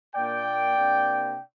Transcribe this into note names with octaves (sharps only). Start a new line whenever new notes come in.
A#2 A#3 D4 D5 G5
C3 A#3 D4